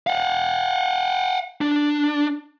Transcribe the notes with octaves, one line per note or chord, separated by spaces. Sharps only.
F5 F#5
D4